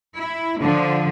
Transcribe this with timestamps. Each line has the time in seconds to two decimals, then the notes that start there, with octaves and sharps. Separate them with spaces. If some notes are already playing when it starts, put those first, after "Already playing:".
0.19 E4
0.62 D3 F3